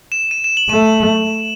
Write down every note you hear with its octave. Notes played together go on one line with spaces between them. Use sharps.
E7
D#7
E7
F#7
A3 D#7